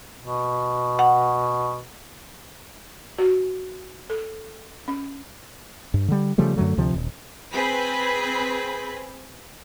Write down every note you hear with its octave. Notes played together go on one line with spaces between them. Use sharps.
B2
F#5
F#4
A4
C#4
G2
D3 G3
C#3 F3 G3 A3
F#2 D3 F#3 A3
D2 C3 F3
D#1
C4 G#4 B4 B5